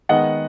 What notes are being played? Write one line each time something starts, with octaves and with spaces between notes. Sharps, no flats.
D#3 G#3 B3 D#5 F#5